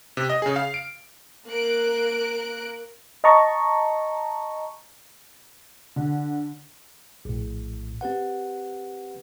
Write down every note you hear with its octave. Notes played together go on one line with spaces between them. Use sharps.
C3
D#5
C#3 G#4
F5
D7
A#3 A#4 F#6 D7
D#5 A5 A#5 C#6
D3
A#1 A2
C4 G4 B4 F#5